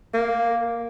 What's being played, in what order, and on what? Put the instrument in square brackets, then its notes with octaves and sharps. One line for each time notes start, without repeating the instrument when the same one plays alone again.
[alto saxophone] A#3